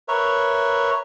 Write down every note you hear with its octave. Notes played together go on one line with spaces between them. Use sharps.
A#4 B4 C#5 E5